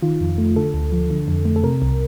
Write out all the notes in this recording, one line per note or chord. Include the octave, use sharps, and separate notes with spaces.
D#3 F4
F2
A3
D3 A4
D2
F3
D3
F2
A3
A4
C3 A#4
C2